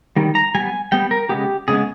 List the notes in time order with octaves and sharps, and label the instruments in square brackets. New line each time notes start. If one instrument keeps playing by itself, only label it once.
[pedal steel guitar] D#3 G3
A#5
G3 B3 G#5
G3 B3 G5
A#4
C#3 G#3 B3 G4
C#3 G#3 B3 G#4